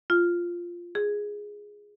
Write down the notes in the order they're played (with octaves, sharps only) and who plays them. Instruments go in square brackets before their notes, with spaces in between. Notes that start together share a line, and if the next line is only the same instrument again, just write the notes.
[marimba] F4
G#4